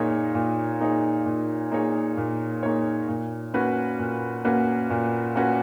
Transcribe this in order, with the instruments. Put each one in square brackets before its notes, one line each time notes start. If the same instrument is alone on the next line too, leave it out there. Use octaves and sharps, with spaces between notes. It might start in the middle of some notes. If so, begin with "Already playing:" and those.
Already playing: [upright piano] A#2 A#3 D#4 G#4 C#5
A#2
A#3 D#4 G#4 C#5
A#2
A#3 D#4 G#4 C#5
A#2
A#3 D#4 G#4 C#5
A#2
A#3 C#4 F#4 B4
A#2
A#3 C#4 F#4 B4
A#2
A#3 C#4 F#4 B4